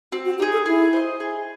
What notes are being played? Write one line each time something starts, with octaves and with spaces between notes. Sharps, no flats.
C4 F#4
F#4
D#4 G4 G#4
A4
E4 G#4
C5 D#5
G#4